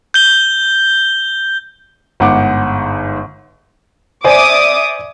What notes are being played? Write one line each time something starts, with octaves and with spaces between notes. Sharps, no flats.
G6 G7
G1 G#2 F#5 D6
C5 D5 E5 G#5 D6 D#6